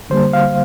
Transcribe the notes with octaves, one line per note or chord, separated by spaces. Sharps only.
D3 G3 A#3 C5
F5